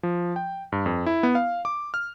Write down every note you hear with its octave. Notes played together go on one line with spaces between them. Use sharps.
F3
G5
G2
F2
E4
B3
F5
D6
F6